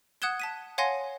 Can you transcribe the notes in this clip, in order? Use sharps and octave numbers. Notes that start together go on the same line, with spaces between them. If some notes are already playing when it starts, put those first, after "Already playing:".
F#5 D#6 F#6 G#6 E7 G7
A5 B6 D#7
C#5 F5 F#5 G#5 C6 A#6